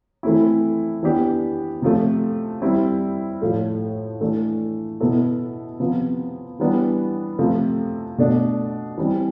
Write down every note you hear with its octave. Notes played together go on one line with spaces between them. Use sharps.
E3 A3 C4 E4
E3 B3 D4 G4
C3 F3 A3
G3 C4 E4
A2 F3 A3
E3 A3 D4
B2 B3 E4 A4
C3 F3 B3
E3 G3 B3 D4
C3 F3 A3
B2 A3 D4
E3 G3 C4